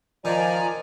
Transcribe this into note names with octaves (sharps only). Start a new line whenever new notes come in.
D#3 F3 D5 G#5 A#5